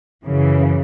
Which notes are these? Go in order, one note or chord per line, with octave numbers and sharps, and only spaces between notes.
F#2 C#3 E3